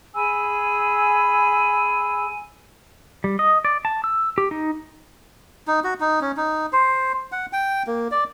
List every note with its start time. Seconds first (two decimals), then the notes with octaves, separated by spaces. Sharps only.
0.15 G#4 G#5 B5 E6
3.24 G3
3.39 D#5
3.65 D5
3.85 A5
4.04 E6
4.38 G4
4.51 D#4
5.67 D#4
5.84 F#4
6.00 D#4
6.21 C#4
6.37 D#4
6.73 C5
7.32 F#5
7.53 G5
7.87 A#3
8.11 D5